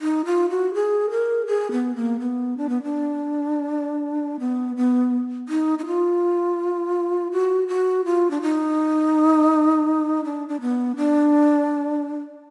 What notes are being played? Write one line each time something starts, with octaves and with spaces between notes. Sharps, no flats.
D#4
F4
F#4
G#4
A#4
G#4
B3
A#3
B3
D4
B3
D4
B3
B3
D#4
D#4
F4
F#4
F#4
F4
D4
D#4
D4
D4
B3
D4